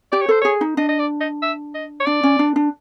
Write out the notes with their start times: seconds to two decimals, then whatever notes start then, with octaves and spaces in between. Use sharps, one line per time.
0.12 G4 D5
0.22 C#5
0.29 A4 C5
0.41 G#4 C#5
0.61 D#4
0.77 D4 D#5
0.89 D#5
0.99 D5
1.21 D#5
1.42 E5
1.75 D#5
2.00 C#5
2.06 D4 D5
2.23 C#4
2.39 D4
2.56 D4